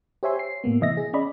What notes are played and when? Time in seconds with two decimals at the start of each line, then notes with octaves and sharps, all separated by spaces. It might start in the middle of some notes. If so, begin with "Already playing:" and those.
0.23 G4 C5 C#5 E5 G#5 C6
0.39 C7
0.64 A2 A#3 B3
0.81 C3 E3 D#5 E5 A#6
0.97 G#4
1.13 C#4 D5 D#5 B5